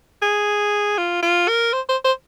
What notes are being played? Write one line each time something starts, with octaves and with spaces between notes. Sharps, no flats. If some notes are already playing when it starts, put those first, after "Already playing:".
G#4
F4
F4
A#4
C5
C5
C5